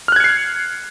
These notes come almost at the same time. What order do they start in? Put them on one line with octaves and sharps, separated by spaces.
F6 F#6 G#6 C#7 C7